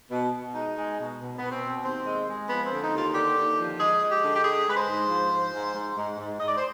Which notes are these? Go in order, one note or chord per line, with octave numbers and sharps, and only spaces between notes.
B2
B2
G#3 D#4
G#3
B2
B2
B2 B3
C4
B2
D#2 C4
G#3
G#3
F3 B3
D3 C4
D#4
D#2
F4
D3 G4
D#2
F3
G#3 G#4
G#3
G4
D3
G4
G#3 G#4
G#3 B4
C5
G#2
F3
G#2
G#2
G#2
G#2
G#2
G#2 D#5
D5
C5